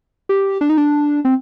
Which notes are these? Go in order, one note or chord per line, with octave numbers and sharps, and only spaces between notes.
G4
D4
D#4
D4
C4